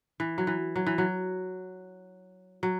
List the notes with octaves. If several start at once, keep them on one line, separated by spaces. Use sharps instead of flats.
E3
F#3
E3
F#3
E3
F#3
F#3